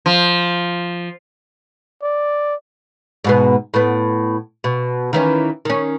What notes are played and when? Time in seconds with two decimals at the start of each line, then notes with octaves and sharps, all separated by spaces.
0.06 F3
2.03 D5
3.25 G#2 B2 B3
3.74 A2 B3
4.64 B2
5.13 D#3 E3 C#4
5.65 D#3 C#4